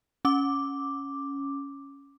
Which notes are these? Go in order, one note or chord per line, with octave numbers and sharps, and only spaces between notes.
C#4 D6